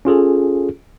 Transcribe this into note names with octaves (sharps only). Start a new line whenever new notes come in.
C#4 F4 G#4 A4